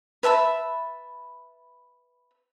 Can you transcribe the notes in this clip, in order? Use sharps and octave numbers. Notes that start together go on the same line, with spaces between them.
B4 E5 A5 B5